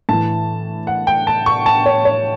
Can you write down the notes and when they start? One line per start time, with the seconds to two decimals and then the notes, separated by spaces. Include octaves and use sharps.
0.09 A2 E3 A5
0.87 F#5
1.07 G5
1.27 A5
1.46 C#6
1.66 A5
1.86 C#5
2.05 C#5